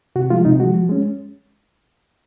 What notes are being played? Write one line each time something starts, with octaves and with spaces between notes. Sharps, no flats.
C3 F#4
F3 G#3 F4
C3 D#4
F3 G#3 F#4
F3
G#3 C#4